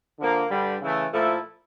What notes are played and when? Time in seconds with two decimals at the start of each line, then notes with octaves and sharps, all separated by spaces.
0.19 D3 F3 A#3
0.50 G2 D3 G3
0.81 C#3 E3 A3
1.13 A#2 F3 A3 E4 A4